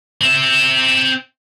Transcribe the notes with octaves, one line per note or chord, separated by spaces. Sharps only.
C4 E5